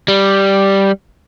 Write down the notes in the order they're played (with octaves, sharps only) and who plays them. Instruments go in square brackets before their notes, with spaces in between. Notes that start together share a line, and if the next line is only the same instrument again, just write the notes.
[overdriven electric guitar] G3